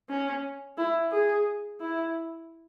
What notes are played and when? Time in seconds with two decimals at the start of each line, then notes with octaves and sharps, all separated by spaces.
0.10 C#4
0.78 E4
1.11 G#4
1.81 E4